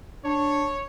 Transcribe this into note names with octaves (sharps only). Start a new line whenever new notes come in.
D4 C#5